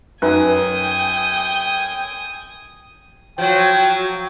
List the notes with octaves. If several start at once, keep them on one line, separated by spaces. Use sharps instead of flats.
F#2 D#4 B4 G5 G#5 D#6
F3 F#3 F#4 G5